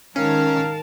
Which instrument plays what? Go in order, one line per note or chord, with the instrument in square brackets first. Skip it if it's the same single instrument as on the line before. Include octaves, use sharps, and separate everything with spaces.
[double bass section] G#2 D#3 [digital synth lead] C#4 [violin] A#4 A5 [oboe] F5